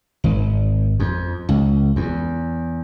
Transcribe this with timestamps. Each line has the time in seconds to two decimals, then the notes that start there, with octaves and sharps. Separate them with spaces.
0.24 G#1
1.00 F2
1.49 C#2
1.96 E2